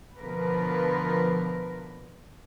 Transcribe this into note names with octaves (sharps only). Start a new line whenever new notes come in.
B2 D3 F3 A#4 B4